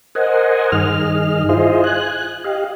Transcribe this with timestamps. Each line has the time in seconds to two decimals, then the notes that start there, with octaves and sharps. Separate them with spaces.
0.15 A#4 C5 D#5 F#5 G#5
0.72 G2 D#3 G#4 D#5 F6
1.49 E4 F4 G#4 C5 D#5
1.84 G#5 F#6
2.44 G4 D#5 F5